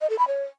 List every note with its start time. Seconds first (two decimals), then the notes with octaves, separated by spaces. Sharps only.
0.01 D#5
0.10 A4
0.19 B5
0.27 C#5